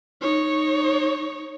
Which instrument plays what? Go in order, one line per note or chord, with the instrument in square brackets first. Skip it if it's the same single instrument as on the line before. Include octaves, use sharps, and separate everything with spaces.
[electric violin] D#4 C#5